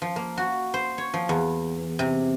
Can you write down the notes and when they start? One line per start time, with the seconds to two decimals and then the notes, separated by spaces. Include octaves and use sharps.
0.02 F3
0.16 A#3
0.37 F#4
0.74 C5
0.98 C#5
1.14 F3
1.29 E2
1.99 C3